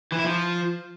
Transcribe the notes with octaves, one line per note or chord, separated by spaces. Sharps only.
E3
E4
F3